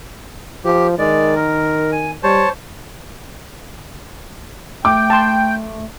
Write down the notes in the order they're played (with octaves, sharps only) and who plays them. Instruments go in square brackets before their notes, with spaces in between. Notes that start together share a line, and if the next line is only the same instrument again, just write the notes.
[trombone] F3 [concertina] G4
[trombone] D#3 [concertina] G#3 D5
[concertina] A#4
G#5
[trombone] G3 [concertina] C5 C#5 A5
[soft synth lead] A3 [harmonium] G5 [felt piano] D6
[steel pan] A5 C6